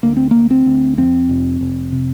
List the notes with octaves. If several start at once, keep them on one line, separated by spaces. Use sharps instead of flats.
D2 A#3
C4
D2 A#3
C4
D2
F2 C4
F1
F1
C3